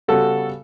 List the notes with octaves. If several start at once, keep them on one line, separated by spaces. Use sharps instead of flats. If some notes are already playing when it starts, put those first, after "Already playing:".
C#3 G3 B3 F#4 A4